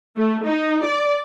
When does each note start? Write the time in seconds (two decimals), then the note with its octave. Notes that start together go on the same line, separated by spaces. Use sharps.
0.18 A3
0.46 D#4
0.86 D5